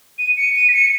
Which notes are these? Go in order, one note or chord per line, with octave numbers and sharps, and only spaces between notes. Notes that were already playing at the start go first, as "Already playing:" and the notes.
D#7
C#7
D#7
B6
C#7